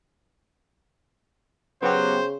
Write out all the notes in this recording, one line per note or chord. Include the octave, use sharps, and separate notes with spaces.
C#3 F#3 B3 G4 C5